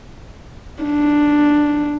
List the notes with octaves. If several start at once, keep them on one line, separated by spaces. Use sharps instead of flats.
D4